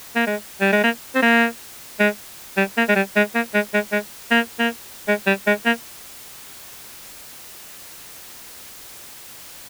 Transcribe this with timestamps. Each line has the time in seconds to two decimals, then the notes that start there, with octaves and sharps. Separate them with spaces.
0.16 A#3
0.27 G#3
0.61 G3
0.72 G#3
0.84 A#3
1.15 C4
1.22 A#3
2.00 G#3
2.57 G3
2.77 A#3
2.89 G#3
2.95 G3
3.16 G#3
3.35 A#3
3.54 G#3
3.73 G#3
3.92 G#3
4.31 A#3
4.59 A#3
5.08 G#3
5.27 G3
5.47 G#3
5.65 A#3